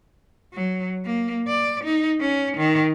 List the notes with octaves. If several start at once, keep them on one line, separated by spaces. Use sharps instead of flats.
F#3
A#3
D5
D#4
C#4
D#3